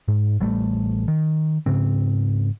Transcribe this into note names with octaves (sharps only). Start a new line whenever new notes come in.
G#2
A1 G3 A3
D#3
G#2 C#3 C4